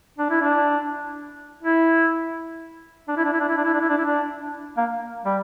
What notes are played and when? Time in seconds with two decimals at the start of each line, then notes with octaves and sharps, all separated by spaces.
0.18 D4
0.30 E4
0.42 D4
1.63 E4
3.08 D4
3.17 E4
3.24 D4
3.33 E4
3.40 D4
3.49 E4
3.57 D4
3.65 E4
3.73 D4
3.81 E4
3.89 D4
3.98 E4
4.05 D4
4.77 A#3
5.25 G3